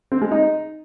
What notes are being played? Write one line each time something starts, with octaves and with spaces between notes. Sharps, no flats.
C4
G#3
D#4